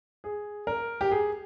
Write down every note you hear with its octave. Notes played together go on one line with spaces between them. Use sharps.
G#4
A#4
G4
G#4